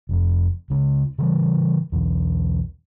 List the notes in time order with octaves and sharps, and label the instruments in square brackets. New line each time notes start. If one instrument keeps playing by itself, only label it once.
[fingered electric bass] F1 F2
C#2 C#3
C#3 E3 G3
B1 E2